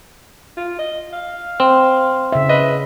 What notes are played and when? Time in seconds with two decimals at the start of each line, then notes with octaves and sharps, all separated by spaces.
0.57 F4
0.79 D#5
1.13 F5
1.60 C4
2.32 C#3 E5
2.49 B4 D#5